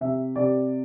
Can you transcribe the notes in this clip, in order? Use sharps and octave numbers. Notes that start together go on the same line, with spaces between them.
C3 E5
C3 D5